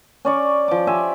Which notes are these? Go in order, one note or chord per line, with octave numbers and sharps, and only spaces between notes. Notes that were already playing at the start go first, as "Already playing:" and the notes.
C#4 D5 C#6
F3 D6
G4 C5 E5 G#5